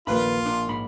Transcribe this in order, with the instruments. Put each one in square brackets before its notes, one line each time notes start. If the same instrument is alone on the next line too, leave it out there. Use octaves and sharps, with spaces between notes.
[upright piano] A#1 A#3 [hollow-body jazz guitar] D#2 B4 B5 [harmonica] F4
[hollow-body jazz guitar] D4 A#4
G#2 B5